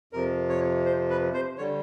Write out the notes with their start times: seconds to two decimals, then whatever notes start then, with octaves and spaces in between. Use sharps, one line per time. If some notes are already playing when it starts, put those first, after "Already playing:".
0.13 F2 C3 F3 A#4
0.49 C#5
0.86 C5
1.10 B4
1.34 C5
1.58 D3 G3 C#5